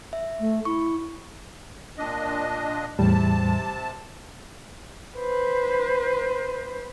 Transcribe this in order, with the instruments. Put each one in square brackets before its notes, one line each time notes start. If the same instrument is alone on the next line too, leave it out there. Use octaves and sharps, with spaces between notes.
[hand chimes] E5
[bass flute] A3
[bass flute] E4 [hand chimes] C#6
[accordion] A#2 D4 D#5
[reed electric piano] E2 A2 G3 [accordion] C3 A5
[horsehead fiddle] B4 C5